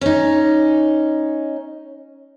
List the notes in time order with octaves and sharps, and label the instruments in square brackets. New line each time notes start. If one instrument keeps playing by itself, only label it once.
[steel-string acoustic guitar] C#4 D#4